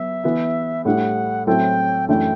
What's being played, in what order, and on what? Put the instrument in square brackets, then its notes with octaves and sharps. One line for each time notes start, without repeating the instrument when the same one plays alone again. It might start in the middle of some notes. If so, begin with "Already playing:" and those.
Already playing: [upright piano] F#3 B3 [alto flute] E5
[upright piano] E3 B3 E4
[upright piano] A2 G3 D4 [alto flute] F#5
[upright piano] A2 F#3 C4 E4 A4 [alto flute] G5
[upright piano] F#2 E3 A3 D4 [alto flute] G5